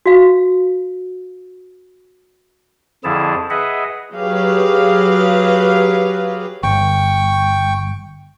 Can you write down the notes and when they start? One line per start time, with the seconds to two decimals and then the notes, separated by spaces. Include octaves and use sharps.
0.06 F#4 F5
3.04 F2 D3 F3 E4 G#4 A5
3.50 G#4 B4 D#5 E5 F#5
4.14 F#3 G4 G#4 B4 F5
6.63 G1 G5 C#6